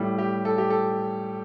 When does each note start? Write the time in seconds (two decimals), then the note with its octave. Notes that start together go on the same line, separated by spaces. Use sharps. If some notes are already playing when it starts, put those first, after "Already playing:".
Already playing: A2 G3
0.18 G4
0.45 A4
0.58 G4
0.70 A4